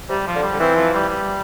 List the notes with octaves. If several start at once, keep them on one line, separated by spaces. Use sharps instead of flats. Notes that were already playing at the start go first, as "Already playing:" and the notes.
C3 G3
F3
D3
G3
D3
E3 C4
F3
G3
G3